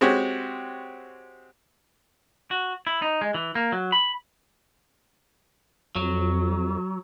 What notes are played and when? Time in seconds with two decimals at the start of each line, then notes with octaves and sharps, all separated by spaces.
0.01 G#3 C4 F#4 G4 C#5
2.51 F#4
2.87 E4
3.02 D#4
3.21 G#3
3.34 E3
3.55 A#3
3.72 F#3
3.92 B5
5.96 F2 F#3